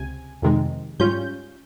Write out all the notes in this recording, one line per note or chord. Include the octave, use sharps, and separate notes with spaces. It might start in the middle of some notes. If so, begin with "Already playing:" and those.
Already playing: C#2 C3 G#5
F2 C3 D#3 G#3
G#2 G3 C#4 F4 G6